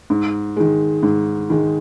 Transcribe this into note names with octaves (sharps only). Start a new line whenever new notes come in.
G#2
D#3 G#3
G#2
D#3 G#3